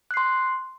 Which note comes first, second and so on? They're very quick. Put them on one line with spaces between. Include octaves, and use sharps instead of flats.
F#6 C7 C6